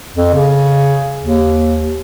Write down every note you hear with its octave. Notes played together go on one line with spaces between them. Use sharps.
F2
C#3
D#2